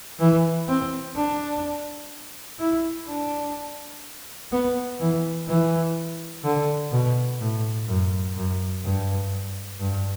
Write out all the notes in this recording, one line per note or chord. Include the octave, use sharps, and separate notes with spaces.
E3
C4
D4
E4
D4
B3
E3
E3
D3
B2
A2
F#2
F#2
G2
G2